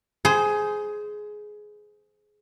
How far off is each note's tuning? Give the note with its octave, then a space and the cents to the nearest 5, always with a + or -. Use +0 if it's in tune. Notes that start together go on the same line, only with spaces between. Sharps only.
G#4 +15 C5 -15